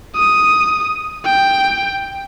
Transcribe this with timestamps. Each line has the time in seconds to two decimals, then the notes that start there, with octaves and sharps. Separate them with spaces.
0.15 D#6
1.25 G5